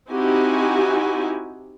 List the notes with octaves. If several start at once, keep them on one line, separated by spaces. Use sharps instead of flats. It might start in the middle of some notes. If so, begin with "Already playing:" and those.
C4 D#4 E4 F#4 G4 G#5